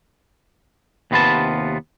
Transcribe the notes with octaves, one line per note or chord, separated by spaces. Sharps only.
D#2 C3 B3 F4 B4 A5